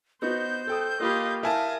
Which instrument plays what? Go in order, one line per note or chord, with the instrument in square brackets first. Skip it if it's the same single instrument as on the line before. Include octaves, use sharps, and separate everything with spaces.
[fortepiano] B3 D#4 F#4 [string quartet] C5 [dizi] G6
[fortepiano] A4 G5 D#6
[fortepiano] A#3 F4 G4 [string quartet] D#5 F5 B5
[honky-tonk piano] E4 G#5 A5 [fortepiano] A#4 [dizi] F5 [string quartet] D#6